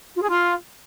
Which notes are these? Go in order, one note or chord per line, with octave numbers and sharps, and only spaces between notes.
F4
G#4
F4